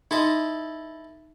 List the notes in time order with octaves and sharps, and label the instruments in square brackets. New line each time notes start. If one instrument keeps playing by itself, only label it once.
[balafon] D#4 [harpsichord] E4 A4 D#5